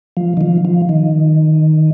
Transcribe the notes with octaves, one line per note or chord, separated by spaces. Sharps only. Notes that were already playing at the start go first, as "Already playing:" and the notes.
F3
D#3
F3
F3
D#3